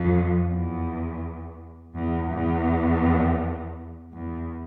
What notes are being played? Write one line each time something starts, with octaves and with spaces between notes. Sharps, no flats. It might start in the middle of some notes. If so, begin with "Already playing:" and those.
Already playing: F2
E2
E2
E2
E2